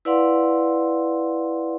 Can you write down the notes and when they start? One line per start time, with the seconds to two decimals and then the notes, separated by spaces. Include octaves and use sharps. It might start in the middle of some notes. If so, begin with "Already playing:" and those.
0.05 E4 B4 D5 F5 F#5 C6